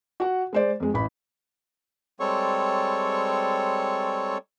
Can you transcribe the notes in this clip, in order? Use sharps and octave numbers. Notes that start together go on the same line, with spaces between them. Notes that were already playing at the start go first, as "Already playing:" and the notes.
F#4 F#5
G#3 C5 D5
F2 G#3
A1 B5
G3 G#3 C4 A4 C#5 C#6